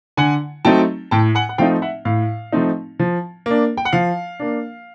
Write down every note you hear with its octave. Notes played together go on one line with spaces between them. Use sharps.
D3 F#5 G#5
F#3 A3 C4 D#4 G5 A5
A2 G5 A5
F#5 G#5
F#5
F3 A3 C4 D#4 F5 G5
E5 F#5
A2 F5
F3 A3 C4 D#4
F3
A#3 D4
G5
F#5
F3 F5
A#3 D4